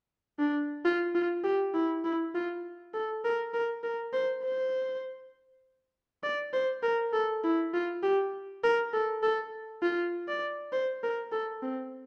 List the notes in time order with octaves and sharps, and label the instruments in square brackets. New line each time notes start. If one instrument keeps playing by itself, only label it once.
[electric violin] D4
F4
F4
G4
E4
E4
F4
A4
A#4
A#4
A#4
C5
C5
D5
C5
A#4
A4
E4
F4
G4
A#4
A4
A4
F4
D5
C5
A#4
A4
C4